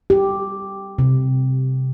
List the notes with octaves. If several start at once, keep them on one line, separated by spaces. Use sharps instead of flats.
G4
C3